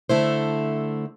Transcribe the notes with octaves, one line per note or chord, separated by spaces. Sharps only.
D3 A3 E4 C5